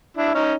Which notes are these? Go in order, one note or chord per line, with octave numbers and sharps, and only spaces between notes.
D4 E4
C#4 D#4